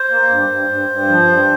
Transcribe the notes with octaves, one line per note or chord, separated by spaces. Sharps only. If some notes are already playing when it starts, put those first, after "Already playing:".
Already playing: C5
A#3
G2
G2
G2
G2
F3
G2